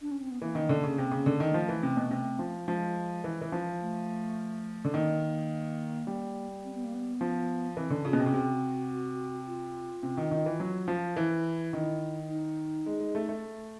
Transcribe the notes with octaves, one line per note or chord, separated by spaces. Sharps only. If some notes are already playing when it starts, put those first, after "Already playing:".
D4
C#4
C4
B3
E3 A#3
D#3
D3
C#3
C3
C#3
D3
D#3
A#3
F3 A3
E3
C3
B2
C3
F3
F3 G#3
E3
E3
F3
A3
D3
D#3 A#3
G3
C4
B3
A#3
B3
F3
E3 C4
D3 C#4
C#3 F4
B2
C3 F#4
C#3
C3 F#4
F4
C3
D#3
D#3
E3
F#3
F3
E3 E4
D#3
D#4
G#3
G#3
A3
A3